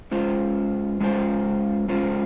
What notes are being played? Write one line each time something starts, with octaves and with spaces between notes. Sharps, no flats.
G#3 C#4 F4 C5
G#3 C#4 F4 C5
G#3 C#4 F4 C5